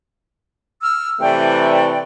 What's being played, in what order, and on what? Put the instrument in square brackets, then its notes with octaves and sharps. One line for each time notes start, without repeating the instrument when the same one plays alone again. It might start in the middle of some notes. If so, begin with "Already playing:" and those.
[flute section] E6 F6
[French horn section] C3 E3 A3 [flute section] D5 G5